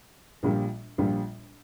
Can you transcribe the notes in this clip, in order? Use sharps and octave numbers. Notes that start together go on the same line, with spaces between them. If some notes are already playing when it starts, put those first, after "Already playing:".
A#1 A#2 G3
A#1 A#2 G3